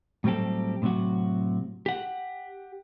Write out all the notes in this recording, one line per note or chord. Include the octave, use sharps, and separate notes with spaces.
A2 F#3 G3 C4 G4 A4
A2 C3 E3 F#3 F#4
G4 F#5